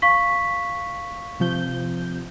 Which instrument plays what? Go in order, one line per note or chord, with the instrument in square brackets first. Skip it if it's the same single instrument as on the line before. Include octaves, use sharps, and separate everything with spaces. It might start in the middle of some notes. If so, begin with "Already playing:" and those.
[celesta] F5 C#6 B6
[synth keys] C3 F3 G6